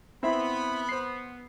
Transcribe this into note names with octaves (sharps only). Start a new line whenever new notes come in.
B3 C4 E4 E5 B5
C5 C7